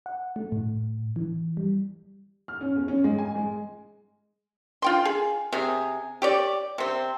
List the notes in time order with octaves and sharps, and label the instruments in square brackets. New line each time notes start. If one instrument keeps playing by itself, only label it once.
[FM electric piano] F#5
A3
A2
E3
G3
[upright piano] F6
C#4
E2
C#4
G#3
G#5
G#3
[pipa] F4 G5 C6
G#4
C3 G#4
G4 C#5 D5
C3 C4